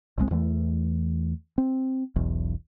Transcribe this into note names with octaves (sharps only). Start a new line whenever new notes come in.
G1 C2 G#3 C4
E2 E3 G#3 A3
C4
E1 B1 E2